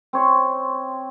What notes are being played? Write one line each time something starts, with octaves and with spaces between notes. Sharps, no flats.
C4 C#5 C6